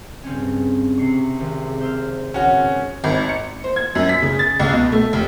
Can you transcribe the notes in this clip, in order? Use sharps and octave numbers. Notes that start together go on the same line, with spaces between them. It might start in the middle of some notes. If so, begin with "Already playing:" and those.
G2 C#3 C4 C#4
C3 C#6 C7
G#1
C5 E6 F6
G#1 C#3 C#4 F#4
G#1
C#7
C5
G#6
F#2
B6
C#3
A6
C#2
B2
A3
F1